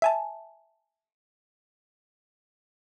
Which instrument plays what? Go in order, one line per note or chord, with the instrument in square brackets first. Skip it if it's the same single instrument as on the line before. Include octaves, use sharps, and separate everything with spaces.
[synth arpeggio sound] E5 G#5 A5